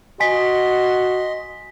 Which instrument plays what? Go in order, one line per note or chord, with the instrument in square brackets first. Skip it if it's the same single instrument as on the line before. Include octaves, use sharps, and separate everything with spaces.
[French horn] F#4 [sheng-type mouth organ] D#5 C6 [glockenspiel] G#5 B6